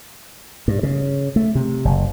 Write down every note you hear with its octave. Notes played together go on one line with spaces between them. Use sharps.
G2
C#3
A3
C3
F#1